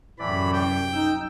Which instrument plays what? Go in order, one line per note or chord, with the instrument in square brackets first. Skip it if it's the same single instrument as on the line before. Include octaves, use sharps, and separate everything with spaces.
[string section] C2 F#2 [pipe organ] A2 E3 D5 [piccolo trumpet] B5
[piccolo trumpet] G5
[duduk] D#4 [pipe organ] E6 G6